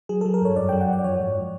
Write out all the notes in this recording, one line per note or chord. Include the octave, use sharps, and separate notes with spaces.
F#3 G#4
F#3 A4
A#4
G2 C#5
F#2 D5
F#3 G5
F#5
F#2 D5
D5
F3 C#5
G#2